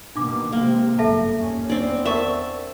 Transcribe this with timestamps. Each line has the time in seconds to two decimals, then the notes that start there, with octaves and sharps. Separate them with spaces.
0.15 B2 D#3 A#3 D4 D6
0.52 C3 G#3 A#3 C4
0.99 G1 C#2 F#2 A4 E5 A5
1.36 D#2 A#2 C#4
1.70 E2 B3 C4 D4 D5
2.06 A#4 D5 E5 A5 C#6